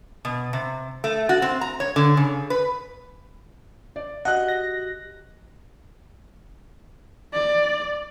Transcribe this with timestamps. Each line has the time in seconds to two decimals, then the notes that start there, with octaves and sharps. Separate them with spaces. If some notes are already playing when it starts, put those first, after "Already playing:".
0.25 B2
0.53 C3
1.04 A3
1.29 F#4
1.42 C4
1.61 A#5
1.80 C#5
1.96 D3
2.17 C#3
2.50 B4
3.96 D5
4.25 F#4 G4 D#5 F#5 F#6
4.48 A#6
7.33 D5